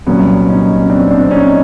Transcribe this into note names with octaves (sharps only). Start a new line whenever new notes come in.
C2 A#2 F#3 B3 C#4
C#4 D#4
C#4
C4 D4
C4 D4
C#4 D#4